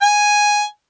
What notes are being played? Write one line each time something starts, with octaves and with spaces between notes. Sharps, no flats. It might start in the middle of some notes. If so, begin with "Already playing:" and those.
G#5